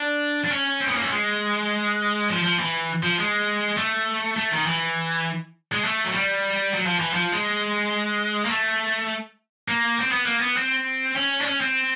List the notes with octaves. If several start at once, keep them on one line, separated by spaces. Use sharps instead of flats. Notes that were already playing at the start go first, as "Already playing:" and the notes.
Already playing: D4
D4
C#4
C4
B3
A#3
A3
G#3
F3
F3
E3
F3
G#3
A3
A3
D#3
E3
G#3
A3
F#3
G3
F#3
F3
E3
F3
G#3
A#3
A3
A#3
C4
B3
A#3
B3
C4
C#4
D4
C#4
C4